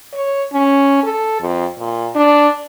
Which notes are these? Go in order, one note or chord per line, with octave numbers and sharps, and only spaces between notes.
C#5
C#4
A4
F2
A#2
D4